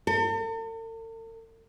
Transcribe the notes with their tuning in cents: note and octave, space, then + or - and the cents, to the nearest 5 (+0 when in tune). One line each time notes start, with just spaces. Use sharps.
A4 +45